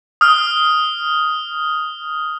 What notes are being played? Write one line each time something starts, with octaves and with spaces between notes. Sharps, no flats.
D#6 F6